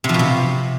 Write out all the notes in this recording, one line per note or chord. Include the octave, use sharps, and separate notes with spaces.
C3
F3
B2
C3